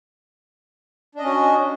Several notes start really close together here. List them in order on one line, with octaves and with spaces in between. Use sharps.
D4 D#5 C#4 F#4